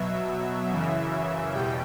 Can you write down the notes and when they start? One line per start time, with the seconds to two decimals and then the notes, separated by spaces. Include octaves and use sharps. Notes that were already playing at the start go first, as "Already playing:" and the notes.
Already playing: B2 F#3 E5
0.69 F#2 C#3 E3
1.54 E2 B2 G3 G5